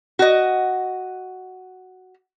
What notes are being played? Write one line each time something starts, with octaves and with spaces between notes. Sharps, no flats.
F#4 D#5